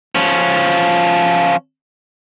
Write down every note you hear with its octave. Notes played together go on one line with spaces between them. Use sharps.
F3 C#4